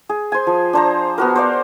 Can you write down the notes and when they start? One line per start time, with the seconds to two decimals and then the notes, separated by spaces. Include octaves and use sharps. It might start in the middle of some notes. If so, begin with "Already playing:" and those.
0.09 G#4
0.32 C5 G#5
0.47 F3
0.73 D4 C5 A#5
1.18 B3 F#4 A#4
1.35 C5 D5 F#5